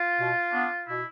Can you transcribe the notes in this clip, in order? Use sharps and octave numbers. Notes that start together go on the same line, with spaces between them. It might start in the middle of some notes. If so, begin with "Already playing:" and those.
Already playing: F4
B2
B3 D4
B2 E4